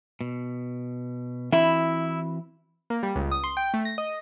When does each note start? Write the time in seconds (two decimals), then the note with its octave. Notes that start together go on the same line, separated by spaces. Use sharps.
0.21 B2
1.52 E3 C4 E4 F#4
2.90 A#3
3.03 G3
3.16 C#2
3.31 D#6
3.44 C6
3.57 G5
3.74 A3
3.85 A#6
3.98 D#5